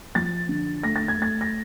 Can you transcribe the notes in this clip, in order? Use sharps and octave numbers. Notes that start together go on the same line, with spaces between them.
F3 A6
D3
A3 A#6
A6
G#6
A3 A6
A#6